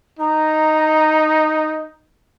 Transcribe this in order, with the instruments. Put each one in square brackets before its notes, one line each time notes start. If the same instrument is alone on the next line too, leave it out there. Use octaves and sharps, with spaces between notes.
[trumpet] D#4 [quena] A#5